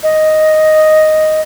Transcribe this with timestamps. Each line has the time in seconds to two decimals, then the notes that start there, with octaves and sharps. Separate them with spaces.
0.03 D#5